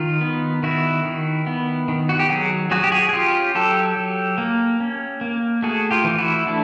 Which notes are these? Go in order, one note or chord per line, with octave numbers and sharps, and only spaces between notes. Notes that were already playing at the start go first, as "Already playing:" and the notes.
Already playing: D#3 D#4 F4
B3
D#3 E4 F#4
D#3
B3
D#3
F#4
G4
F#3 F#4 G#4
F#3 F#4 G#4
G4
F#4 G#4
G#4
C#4 F4 G4
F#3 G4 A4
F#3
A#3
C#4
A#3
A3 F#4 G#4
F4 G4
E3
E4 F#4
A3 D4 E4